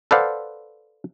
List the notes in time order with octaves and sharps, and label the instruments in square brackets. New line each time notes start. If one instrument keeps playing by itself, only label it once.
[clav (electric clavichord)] A4 B4 C5 D5 F5 F#5